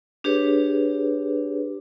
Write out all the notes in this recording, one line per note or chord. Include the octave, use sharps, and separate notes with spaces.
D4 G4 G#4 B4 C#5